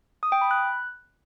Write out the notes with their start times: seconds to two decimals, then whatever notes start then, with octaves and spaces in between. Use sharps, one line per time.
0.23 D#6
0.32 G5
0.41 B5
0.51 F#6